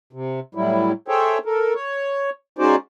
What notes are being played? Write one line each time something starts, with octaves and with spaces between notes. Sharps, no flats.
C3
A2 F#3 G3 E4
G#4 A4 C5 C#5 E5 G5
A4 A#4
C#5
G#3 C#4 D#4 F#4 C5 D5